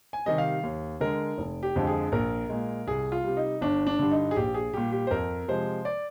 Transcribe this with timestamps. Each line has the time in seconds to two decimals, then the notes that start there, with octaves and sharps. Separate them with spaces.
0.13 G#5
0.26 C3 D#3 G3 D#5
0.38 F5
0.63 D#2
1.00 D3 G#3 A#4
1.38 F1
1.63 G4
1.76 F2 D3 F3 G#3
1.87 G#4
2.12 A#1 A#4
2.49 A#2 G#3
2.87 C2 G#4
3.12 F4
3.24 C3 G3
3.37 D#4
3.61 G1 D4
3.87 D4
3.99 G2 D3
4.11 D#4
4.31 G#4
4.36 A#1 G4
4.54 G#4
4.73 A#2 G3 G4
4.92 G4
5.07 C5
5.11 F2 A#4
5.48 C3 F3 G#3 C5
5.85 D5